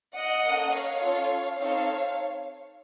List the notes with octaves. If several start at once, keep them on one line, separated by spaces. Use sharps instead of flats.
D#5 F#5
A#3 C#4 A4
C#5 F5
C#4 F4 A4
C4 D#4 A4 C#5 F5